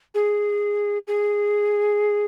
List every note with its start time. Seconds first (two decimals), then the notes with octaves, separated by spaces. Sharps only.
0.14 G#4
1.07 G#4